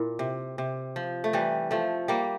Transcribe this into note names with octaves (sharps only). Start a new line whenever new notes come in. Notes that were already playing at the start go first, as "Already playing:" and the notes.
Already playing: A#2 E4 A#4
C3
C3
F3
A3
E3 G3
F3 A3
G3 A#3